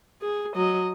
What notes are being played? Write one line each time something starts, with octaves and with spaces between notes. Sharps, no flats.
G#4
F#3 D#5